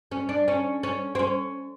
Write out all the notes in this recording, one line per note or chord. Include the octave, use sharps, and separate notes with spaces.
C#4
D4
C#4
C#4
C4
C#4